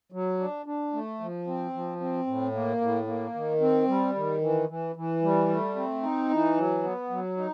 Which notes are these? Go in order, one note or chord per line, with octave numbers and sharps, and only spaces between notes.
F#3
D4
D4
A3
F3
C4
F3
C4
A2
A#3
A2
A#3
D#3
C4
G3
D#3
E3
E3
E3
G3
A3
C4
D#4
E3
F#3
B3
F#3
D#4